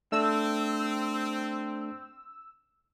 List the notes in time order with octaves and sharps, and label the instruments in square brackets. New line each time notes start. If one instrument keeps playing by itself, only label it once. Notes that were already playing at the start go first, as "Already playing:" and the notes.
[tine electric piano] A3 D4 [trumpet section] C4 [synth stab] E6